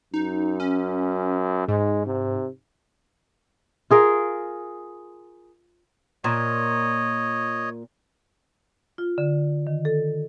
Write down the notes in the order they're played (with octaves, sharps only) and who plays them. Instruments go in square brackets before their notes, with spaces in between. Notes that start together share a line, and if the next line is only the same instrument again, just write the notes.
[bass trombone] F#2 [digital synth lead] D#4
[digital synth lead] C#4
[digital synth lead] G#2 [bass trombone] G#3
[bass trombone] C3
[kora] F4 G#4 A#4
[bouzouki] A#2 [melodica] C#5 D#5
[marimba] F4
D3
D#3
A4